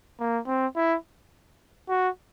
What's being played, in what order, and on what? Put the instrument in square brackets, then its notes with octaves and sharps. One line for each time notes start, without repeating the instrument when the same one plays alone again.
[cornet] A#3
C4
E4
F#4